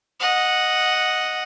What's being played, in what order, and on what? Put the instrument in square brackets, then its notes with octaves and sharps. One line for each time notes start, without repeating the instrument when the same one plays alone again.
[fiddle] D#5 F#5